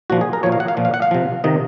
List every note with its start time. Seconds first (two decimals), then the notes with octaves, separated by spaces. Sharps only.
0.10 A#2 F3 F#4
0.21 G#4
0.33 A#4
0.43 A#2 F3 C#5
0.52 F5
0.60 F#5
0.68 F5
0.77 A#2 F3
0.85 F5
0.94 F#5
1.02 F5
1.11 C3 F3
1.44 C3 D#3 D#5